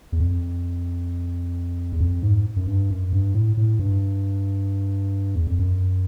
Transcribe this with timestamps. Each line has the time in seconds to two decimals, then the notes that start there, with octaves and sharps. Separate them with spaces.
0.12 E2
0.20 F2
1.92 E2
2.00 F2
2.22 G#2
2.56 F#2
2.67 G2
2.90 F#2
3.13 G2
3.34 A2
3.57 A2
3.79 G2
5.35 E2
5.47 F2
5.59 F#2